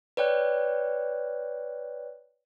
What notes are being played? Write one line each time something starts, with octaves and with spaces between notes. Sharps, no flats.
B4 C#5 D5 G5 F#6